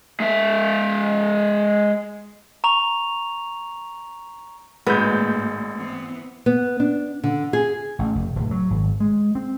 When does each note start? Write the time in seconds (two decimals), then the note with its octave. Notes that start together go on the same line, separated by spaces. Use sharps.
0.20 G#3 E5
2.64 A#5 C#6 F7
4.87 G#1 A2 G#3 A#3 D4 B4 G6
5.76 E3 B3 C4
6.46 B3
6.80 D4
7.24 D3
7.53 G#4
7.99 A1
8.15 F1
8.36 D1
8.51 F#3
8.70 G#1
9.00 G#3
9.35 C4